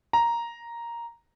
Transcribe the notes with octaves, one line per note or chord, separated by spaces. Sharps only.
A#5